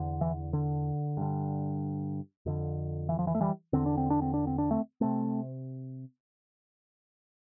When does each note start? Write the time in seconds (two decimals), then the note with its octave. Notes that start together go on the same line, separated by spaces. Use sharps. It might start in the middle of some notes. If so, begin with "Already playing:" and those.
Already playing: E2 D3
0.21 E3
0.53 D3
1.17 G2 D3
2.46 F2 D3
3.09 E3
3.19 F3
3.27 E3
3.35 A3
3.41 E3 G3
3.73 E2 D3 C4
3.86 D4
3.97 C4
4.10 D4
4.22 C4
4.34 D4
4.47 C4
4.58 D4
4.71 A3 C4
5.01 C3 A3 C4